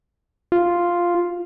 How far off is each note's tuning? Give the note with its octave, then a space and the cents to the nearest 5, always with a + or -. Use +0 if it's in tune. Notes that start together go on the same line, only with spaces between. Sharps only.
F4 +0